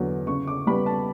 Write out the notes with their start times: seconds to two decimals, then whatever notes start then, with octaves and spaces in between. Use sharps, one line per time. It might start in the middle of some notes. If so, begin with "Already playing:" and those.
Already playing: E2 D3 F#3 B3
0.27 C#3 C#6
0.47 D6
0.67 G3 B3 B5
0.86 A5